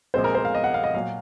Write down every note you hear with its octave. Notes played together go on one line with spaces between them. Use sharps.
A#1 A#2 G#3 C4 C5
A#4
C5
F5
D#5
F#5
F5
D#5
A#2 F#3 F5